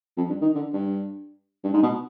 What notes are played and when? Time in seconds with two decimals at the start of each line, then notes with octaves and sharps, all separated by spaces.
0.17 F2
0.29 G2
0.41 D#3
0.55 D3
0.73 G2
1.64 G2
1.73 G#2
1.82 B2